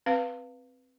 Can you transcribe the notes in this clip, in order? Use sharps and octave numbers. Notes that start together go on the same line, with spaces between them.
C4 B4 F5